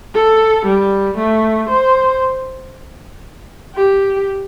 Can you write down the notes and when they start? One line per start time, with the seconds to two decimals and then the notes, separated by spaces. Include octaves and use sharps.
0.15 A4
0.66 G3
1.18 A3
1.69 C5
3.75 G4